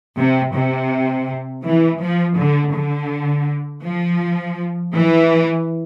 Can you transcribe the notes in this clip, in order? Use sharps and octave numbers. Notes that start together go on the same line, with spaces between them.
C3
C3
E3
F3
D3
D3
F3
E3